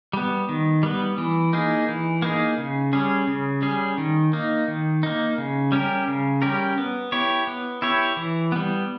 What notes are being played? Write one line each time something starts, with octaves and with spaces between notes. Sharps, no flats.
G3 B3
D#3
G3 B3
E3
A#3 D#4 G#4
E3
A#3 D#4 G#4
C#3
G3 C#4 G#4
C#3
G3 C#4 G#4
D#3
A#3 D#4
D#3
A#3 D#4
C#3
G3 C#4 G4 A#4
C#3
G3 C#4 G4 A#4
B3
E4 G4 C#5
B3
E4 G4 C#5
E3
G3 B3